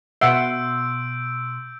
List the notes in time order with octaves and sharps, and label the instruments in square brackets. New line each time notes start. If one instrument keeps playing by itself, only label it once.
[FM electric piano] B2 C6 [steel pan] E5 F#5 [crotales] E6 G6 D7